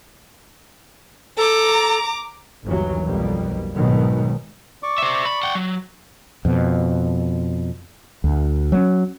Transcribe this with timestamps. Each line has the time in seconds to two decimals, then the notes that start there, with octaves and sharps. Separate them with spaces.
1.37 A4 A#5 D6
2.64 G1 D#2 E3 F#3
3.05 B1 F2 B2 G3 A#3
3.75 G#2 B2 D#3 F#3
4.83 D5 C#6 D6
4.98 C5 E5
5.25 B5
5.43 F#5 G5
5.55 F#3
6.45 F2 B2
8.24 D2
8.72 F#3 A#3 C#4